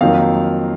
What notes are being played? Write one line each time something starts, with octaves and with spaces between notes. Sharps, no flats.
F2 D#3 F#3 A#3 F5